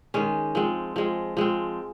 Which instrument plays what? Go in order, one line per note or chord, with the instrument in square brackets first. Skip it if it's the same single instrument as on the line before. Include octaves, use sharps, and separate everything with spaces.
[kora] D#3 G#3 C#4
F3 G#3 C4
F3 G#3 C4
F3 G#3 C4